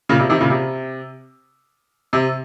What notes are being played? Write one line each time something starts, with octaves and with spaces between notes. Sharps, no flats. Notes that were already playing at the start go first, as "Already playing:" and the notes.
A#2 C#3
C3
C3 D#3
A#2 C#3
C3
C3